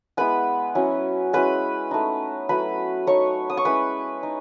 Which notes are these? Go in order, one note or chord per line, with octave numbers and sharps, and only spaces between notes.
G#3 B3 E4 B4 B5
F#3 C#4 E4
G#3 C#4 E4 B4 B5
A3 D#4
F#3 A3 E4 B4 B5
A3 D#4 C#5 C#6
D#6
C#6
G#3 C#4 E4 B4 B5
D#4